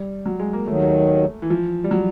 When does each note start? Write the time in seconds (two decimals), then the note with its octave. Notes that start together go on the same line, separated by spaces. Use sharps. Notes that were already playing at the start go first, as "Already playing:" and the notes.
Already playing: G3
0.26 F#3
0.40 G#3
0.53 A#3
0.67 D#2 D#3 F#3 A3
1.42 E3
1.50 F3
1.84 G3
1.91 F#3